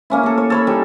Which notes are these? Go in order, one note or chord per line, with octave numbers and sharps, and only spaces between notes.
A#3 C#4 E4
A#3 A4
C#5
A4 C#5 B5
G3 D#4